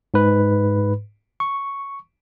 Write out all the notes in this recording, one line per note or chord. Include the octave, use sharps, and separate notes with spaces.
G#2 B4
C#6